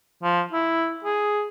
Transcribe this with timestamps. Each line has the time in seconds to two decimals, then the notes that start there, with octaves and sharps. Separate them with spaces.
0.23 F3
0.53 E4
1.05 G#4